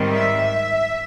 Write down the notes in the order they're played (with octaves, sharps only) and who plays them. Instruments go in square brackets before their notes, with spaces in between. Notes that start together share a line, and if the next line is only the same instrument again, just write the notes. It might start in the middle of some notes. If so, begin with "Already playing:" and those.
Already playing: [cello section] G#2 D#3 G3 C4
E5